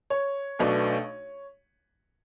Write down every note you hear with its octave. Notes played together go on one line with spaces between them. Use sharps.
C#5
B1 B2 A3 D4